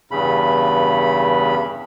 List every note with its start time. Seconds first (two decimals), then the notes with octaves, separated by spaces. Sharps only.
0.11 E2 G2 C#3 B5